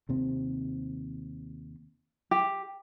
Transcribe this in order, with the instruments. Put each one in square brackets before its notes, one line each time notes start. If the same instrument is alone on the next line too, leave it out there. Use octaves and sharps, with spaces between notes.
[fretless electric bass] D#2 C3 C4
[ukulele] G4